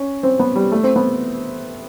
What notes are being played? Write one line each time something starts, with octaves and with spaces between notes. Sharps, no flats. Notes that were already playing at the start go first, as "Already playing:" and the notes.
Already playing: C#4
C4
B3
G3
A3
C4
B3